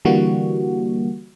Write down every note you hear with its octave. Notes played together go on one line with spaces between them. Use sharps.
D3 E3 G3 A#3 F#4